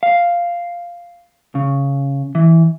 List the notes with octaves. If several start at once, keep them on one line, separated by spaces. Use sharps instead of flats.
F5
C#3
E3